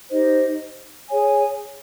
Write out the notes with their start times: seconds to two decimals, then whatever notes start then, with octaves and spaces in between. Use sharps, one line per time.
0.11 D#4 G4 C5 D#5
1.08 G#4 C#5 G#5